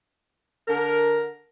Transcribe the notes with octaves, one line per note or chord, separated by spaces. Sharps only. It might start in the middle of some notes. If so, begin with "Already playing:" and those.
D3 A#4